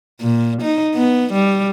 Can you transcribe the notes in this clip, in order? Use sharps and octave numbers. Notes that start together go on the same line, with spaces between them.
A#2
D#4
B3
G3